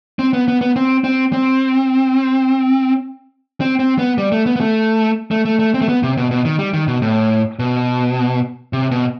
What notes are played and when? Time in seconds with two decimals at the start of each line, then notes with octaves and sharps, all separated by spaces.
0.19 C4
0.33 B3
0.48 B3
0.61 B3
0.76 C4
1.04 C4
1.33 C4
3.61 C4
3.79 C4
3.99 B3
4.18 G3
4.32 A3
4.46 B3
4.56 B3
4.61 A3
5.31 A3
5.45 A3
5.59 A3
5.74 C4
5.81 A3
5.89 B3
6.03 C3
6.17 B2
6.31 B2
6.45 D#3
6.59 G3
6.73 D#3
6.88 B2
7.02 A2
7.59 B2
8.73 C3
8.91 B2